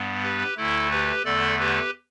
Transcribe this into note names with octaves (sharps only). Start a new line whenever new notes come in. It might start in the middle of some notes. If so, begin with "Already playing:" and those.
Already playing: G2 G3 B3
G4 B4
D2 D3 A3 E4 A4
G4 B4
E2 D3 A3 A4 D5
G4 B4